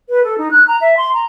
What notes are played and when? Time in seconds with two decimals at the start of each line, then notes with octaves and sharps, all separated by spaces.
0.09 B4
0.24 A4
0.38 D#4
0.51 F#6
0.68 A#5
0.81 E5
0.97 C6
1.14 A#5